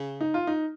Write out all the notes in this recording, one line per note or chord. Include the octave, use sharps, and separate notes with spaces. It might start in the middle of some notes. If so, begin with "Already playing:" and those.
Already playing: C#3
D#4
F4
D#4